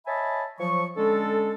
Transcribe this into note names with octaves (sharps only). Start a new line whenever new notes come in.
C#5 D#5 E5 G#5 A5 B5
F3 F#3 C#6
D3 G#3 C#4 A4